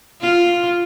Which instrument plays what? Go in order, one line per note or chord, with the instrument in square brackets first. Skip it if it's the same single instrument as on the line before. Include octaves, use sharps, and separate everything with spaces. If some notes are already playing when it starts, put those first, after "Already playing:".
[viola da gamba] F4